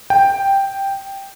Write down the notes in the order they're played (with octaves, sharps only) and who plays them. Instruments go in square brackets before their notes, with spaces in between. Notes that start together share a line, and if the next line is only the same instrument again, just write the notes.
[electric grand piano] G5